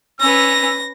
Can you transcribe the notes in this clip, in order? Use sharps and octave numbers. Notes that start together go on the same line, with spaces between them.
C#4 B4 E6 A#6